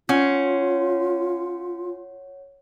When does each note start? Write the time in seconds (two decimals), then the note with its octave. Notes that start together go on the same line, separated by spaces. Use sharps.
0.09 C#4 F4 C#5 F#5